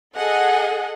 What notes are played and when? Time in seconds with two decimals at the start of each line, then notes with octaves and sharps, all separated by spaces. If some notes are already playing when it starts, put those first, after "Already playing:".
0.15 G#4 A4 D#5 F#5